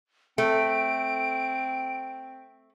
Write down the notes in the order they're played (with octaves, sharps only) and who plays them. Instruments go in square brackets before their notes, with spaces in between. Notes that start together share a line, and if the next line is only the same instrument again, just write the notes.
[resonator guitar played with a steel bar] A3 [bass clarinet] C4 [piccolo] D7